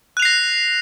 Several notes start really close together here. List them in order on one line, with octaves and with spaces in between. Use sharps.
F#6 F7 C7 A#6